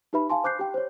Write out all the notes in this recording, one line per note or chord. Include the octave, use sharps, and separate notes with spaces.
D#4 G4 B4 E5 B5
F5 G#5 A5 C6
C5 D6 F#6 G6 C7
G4 G5
C5 C#5